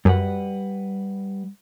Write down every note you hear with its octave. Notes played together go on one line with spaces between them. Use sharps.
F#2 G3 B4 F#5